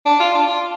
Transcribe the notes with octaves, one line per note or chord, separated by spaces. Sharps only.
D4
F4
D4
F4